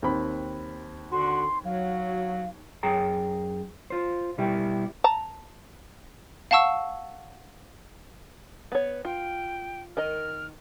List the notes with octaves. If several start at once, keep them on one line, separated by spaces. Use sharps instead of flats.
D#2 C4 B5
D3 F#4 C6
F#3 F5
F#2 G#4 G5 A#5
F4 C5
B2 G3 E4 G4 G5
A5 A#5
F5 F#5 A5 C#6 E6
B3 C#5
F4 G5
D#3 A#4 D#5 F6